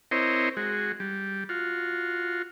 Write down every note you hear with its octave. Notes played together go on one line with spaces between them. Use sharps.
C4 E4 A#4 C5 C#5 D#5
G#3 F#4
G3
F4 F#4